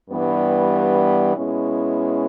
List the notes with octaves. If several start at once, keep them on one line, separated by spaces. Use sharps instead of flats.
G2 E3 G3 B3
B2 G#3 C#4 E4